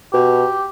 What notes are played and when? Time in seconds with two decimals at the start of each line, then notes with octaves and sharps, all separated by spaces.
0.13 B2 G4